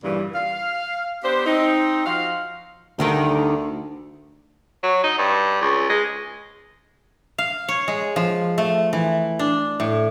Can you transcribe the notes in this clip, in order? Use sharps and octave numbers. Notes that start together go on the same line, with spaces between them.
G2 A#2 C#3 E3 G3
F5
B3 D4 G4 C5
C4 D#4
F3 F#4 F5
D2 D3 D#3 G3
F#3
D#4
G2
C#2
G#3
F5
C#5
G#3
F3
A3
E3
D4
A2